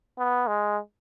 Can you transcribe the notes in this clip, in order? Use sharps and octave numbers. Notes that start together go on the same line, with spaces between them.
B3
G#3